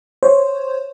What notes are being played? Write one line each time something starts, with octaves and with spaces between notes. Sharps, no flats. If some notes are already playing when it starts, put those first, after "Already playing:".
C5 C#5